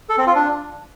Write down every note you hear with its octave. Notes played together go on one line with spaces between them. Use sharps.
A4
C4
F4
D4